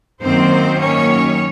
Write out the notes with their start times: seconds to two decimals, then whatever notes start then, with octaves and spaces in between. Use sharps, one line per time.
0.22 F#2 D#3 A#3 C4 C5
0.78 C#4 C#5